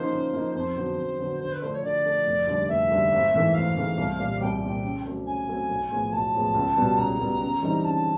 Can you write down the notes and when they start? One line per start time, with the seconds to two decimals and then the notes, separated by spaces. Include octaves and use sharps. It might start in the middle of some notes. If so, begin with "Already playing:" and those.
Already playing: C#3 F3 A#3 D#4 C5
0.12 C#3
0.33 F3 A#3 D#4
0.55 F2 C5
0.76 D3 F#3 B3
0.97 F2
1.19 D3 F#3 B3
1.40 D3 C5
1.52 B4
1.62 F3 A3 D4 C5
1.73 C#5
1.83 D3 D5
2.05 F3 A3 D4
2.26 F1
2.47 D#2 D3 G3
2.69 F1 E5
2.91 D#2 D3 G3
3.12 G#1
3.34 G#2 E3 A3
3.54 G#1 F5
3.77 G#2 E3 A3
3.98 C2
4.19 A#2 G3
4.41 C2 G5
4.62 A#2 G3
4.83 C#3
5.05 F#3 A3 C4
5.26 C#3 G#5
5.48 F#3 A3 C4
5.69 B1
5.91 A2 F3 G#3 B3
6.12 B1 A5
6.34 A2 F3 G#3 B3
6.55 C#2
6.77 B2 G3 B3
6.98 C#2 A#5
7.20 B2 G3 B3
7.41 C#3
7.62 E3 G3 C4 D#4
7.84 C#3 A5